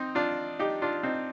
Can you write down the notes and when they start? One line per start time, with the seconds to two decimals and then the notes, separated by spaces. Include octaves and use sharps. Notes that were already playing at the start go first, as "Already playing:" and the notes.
Already playing: C4 D#4
0.15 D4 F4
0.59 D#4 G4
0.82 D4 F4
1.03 C4 D#4